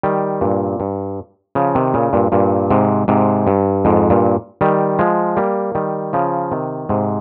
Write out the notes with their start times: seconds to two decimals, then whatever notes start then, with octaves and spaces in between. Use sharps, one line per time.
0.03 D#3 G3
0.41 G2 A#2
0.80 G2
1.55 C#3 F3
1.75 C3 D#3
1.94 A#2 C#3
2.13 G2 A#2
2.32 G2 A#2
2.70 G#2 C3
3.08 G#2 C3
3.47 G2
3.85 F2 G#2
4.10 G2 A#2
4.61 D#3 G3
4.99 F3 G#3
5.37 G3 A#3
5.75 D#3 G3
6.13 C#3 F3
6.52 C3 D#3
6.89 G#2 C3